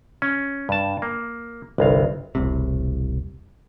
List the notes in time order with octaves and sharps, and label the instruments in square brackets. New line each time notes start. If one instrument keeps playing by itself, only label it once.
[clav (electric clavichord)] C#4
G2 A5
A#3
G1 C2 F5
[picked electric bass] E1 C2 A2 C3